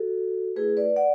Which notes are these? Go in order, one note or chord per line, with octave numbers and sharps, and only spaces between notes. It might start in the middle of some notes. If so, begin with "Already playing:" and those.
Already playing: F#4 A4
A3 E4 G#4 B4
B4 D5
D5 F#5